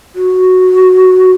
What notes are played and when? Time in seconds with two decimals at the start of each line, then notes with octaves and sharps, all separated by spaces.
0.15 F#4